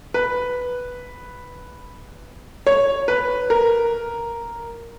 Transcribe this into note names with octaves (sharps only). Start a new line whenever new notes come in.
B4
C#5
B4
A#4